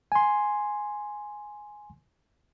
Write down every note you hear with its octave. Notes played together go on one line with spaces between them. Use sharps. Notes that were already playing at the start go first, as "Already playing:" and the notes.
G#5 C6